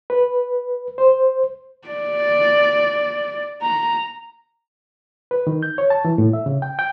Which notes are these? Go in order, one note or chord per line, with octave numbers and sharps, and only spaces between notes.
B4
C5
D5
A#5
B4
D#3
G6
C#5
A5
E3
A2
E5
C#3
G5
G5